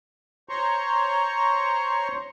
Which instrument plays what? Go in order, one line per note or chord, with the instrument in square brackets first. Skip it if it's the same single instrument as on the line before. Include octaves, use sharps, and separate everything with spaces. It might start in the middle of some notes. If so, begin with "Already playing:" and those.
[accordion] C5 C#5 A#5 C6 C#6